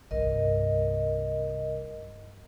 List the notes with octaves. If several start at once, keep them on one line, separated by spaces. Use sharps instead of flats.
C2 G2 A#4 D#5